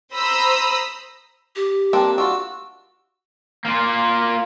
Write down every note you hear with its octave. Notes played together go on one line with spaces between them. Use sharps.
C5 A#5 B5 D#6 E6
G4
A#3 C4 D4 A4
D4 F4 F#4 E6
A#3 F4